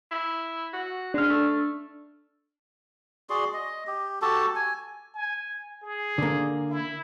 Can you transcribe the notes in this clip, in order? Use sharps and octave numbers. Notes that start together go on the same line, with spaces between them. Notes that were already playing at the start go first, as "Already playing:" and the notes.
E4
F#4
G#3 D4 F6
A3
F#4 G#4 D5 C6
D#5
G4
F#4 G4 A4 A5
G#5
G#5
G#4
D3 A#3
E4